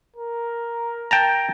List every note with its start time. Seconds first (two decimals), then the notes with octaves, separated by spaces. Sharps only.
0.16 A#4
1.11 G5 A5 A#5